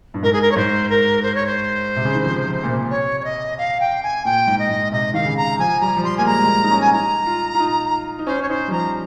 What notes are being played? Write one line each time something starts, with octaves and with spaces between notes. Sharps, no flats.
G2
G#2 A#4
G#4
A#4
C#5
G#2 C5
A#4
C5
C#5
C5
C3
C#3
D#3
F3
F3
A#2
C3
C#5
C#5
D#5
F5
G5
G#5
A#2 G5
G#2
D#5
G#2
C3 D#5
D#3 F5
C#3
A#5
F3 G#5
G3 A#5
F3
G3 C6
A#3 G#5
G#3 A#5
G#3
A#3
D#4
C#4
G#5
D#4 A#5
F4
F4
D#4
D#4
C#4 C5
C#4 C#5
D#4 C5
G3
F3 A#5